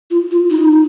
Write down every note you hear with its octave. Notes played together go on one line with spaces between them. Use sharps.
F4
F4
D#4